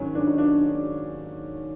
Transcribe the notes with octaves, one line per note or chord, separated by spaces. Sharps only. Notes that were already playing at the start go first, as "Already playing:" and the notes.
Already playing: G#2 D#3 F#3 C#4
D4
D#4
D4